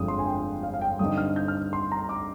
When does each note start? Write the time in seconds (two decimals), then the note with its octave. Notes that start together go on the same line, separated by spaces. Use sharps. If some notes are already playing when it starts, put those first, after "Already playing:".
Already playing: G1 F2 D3 G#3 D4 D#6
0.08 C6
0.19 G#5
0.26 G5
0.63 F5
0.74 F5
0.81 G5
0.99 G2 D3 G3 C4 D#4 D#6
1.18 F6
1.36 G6
1.48 F6
1.73 C6
1.92 A#5
2.09 D6